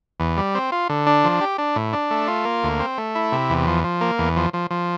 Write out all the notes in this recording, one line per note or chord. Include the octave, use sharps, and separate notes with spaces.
E2
G3
C4
F4
D3
D4
F3
G4
D4
A2
D4
A3
F4
A#3
D2
C4
A3
E4
C3
E2
F3
F3
A#3
E2
F3
F3
F3